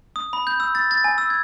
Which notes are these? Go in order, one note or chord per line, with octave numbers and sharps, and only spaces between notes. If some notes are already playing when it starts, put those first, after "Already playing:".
D#6
B5
G6
E6
A6
A6
G#5
E6
G#6